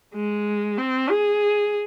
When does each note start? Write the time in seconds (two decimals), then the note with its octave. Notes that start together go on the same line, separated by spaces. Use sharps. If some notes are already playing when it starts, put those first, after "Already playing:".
0.15 G#3
0.78 C4
1.10 G#4